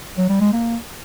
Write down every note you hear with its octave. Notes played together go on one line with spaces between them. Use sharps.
F#3
G3
G#3
A#3